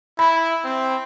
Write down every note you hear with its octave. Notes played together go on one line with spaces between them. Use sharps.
E4 B5
C4